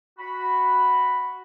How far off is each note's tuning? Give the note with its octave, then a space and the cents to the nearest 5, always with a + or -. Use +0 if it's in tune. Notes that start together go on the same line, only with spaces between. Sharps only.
F#4 +0 B5 +0